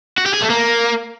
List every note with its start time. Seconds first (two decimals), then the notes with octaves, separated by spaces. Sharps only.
0.18 F#4
0.26 G4
0.34 G#4
0.42 A3
0.50 A#3